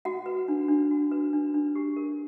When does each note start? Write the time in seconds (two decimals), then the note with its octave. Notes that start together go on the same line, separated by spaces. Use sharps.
0.05 F#4 F#5
0.26 B4
0.48 D4
0.68 D4
0.91 F#4
1.11 B4
1.33 D4
1.54 D4
1.75 G4
1.96 A#4